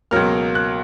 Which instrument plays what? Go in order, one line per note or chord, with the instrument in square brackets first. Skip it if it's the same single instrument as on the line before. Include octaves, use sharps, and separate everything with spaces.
[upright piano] C#2 B2 F#3 A#3 F6
F#6